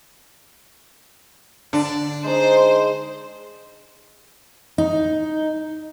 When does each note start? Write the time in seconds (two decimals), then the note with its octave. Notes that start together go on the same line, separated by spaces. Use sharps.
1.73 D3 D4
2.24 G#3 D#4 C5
4.78 D#4